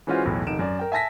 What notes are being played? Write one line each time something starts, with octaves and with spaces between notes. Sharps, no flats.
E3 G#3 C#4 F4 F#4 C5
B1 E2 A2
F1 D#3 D7 E7
F#2 D5
A#4 G5
E5 G#5 A5 A#6 B6